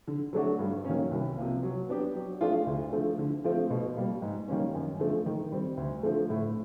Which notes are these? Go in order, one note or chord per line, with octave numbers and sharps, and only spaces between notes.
D3
F#3 A3 D4 F#4
G2
D#3 F#3 A#3 C#4
C2
C3 F3 A#3
F#3
B3 D4 G4
F#3
A3 D4 F4 G#4
D2
D3 F3 A3
D3
F3 A3 C4 F4
B2
G3 A#3
G#2
D#3 G3 A#3 C#4
F#2
D3 F3 A3
D#3
G3 C4
D2
D3 F3 A3
A2